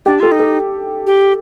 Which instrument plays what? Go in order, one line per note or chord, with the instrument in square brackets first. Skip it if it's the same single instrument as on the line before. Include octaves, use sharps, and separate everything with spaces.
[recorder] D4 [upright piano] G4
[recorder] F4 [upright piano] A4
[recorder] D#4
[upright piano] A4
[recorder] G4